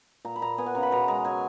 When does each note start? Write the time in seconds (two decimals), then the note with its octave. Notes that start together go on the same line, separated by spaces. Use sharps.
0.25 A#2 A#5
0.36 B5
0.42 A#2 A#5
0.58 B3 G#5
0.66 F#5
0.75 C#3 A#5
0.83 B5
0.92 B2 A#5
1.08 G#3 A#5
1.25 F#3 G#5